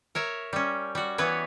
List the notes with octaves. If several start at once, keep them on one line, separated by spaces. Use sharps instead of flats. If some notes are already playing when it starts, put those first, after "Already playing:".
A#4 C#5 E5
G3 C#4
G3 F#4
E3 B3 B4 C#5